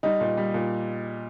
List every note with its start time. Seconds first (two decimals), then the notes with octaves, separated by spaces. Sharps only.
0.03 G3 D#4
0.21 A#2
0.37 G3
0.54 A#2